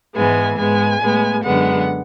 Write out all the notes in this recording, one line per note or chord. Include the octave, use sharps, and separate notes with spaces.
G#2 E3 G#3 B3 G#5
G#2 G#3 B3 G#5
A2 G#3 B3
F#2 D3 G#3 B3 F#5